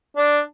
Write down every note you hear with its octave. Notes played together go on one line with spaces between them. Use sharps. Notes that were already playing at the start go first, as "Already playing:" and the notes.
D4